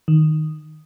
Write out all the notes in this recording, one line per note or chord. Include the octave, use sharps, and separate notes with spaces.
D#3